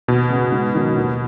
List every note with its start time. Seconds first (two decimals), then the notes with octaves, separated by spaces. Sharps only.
0.08 D#2 B2
0.30 C#3 B3
0.52 G#2
0.75 D#3 F#3 C#4
0.97 D#2